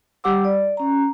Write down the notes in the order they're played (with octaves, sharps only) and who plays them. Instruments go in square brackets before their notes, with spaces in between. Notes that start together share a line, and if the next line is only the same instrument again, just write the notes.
[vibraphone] G3 G4 F#5 D6 E6
D5
C#4 A#5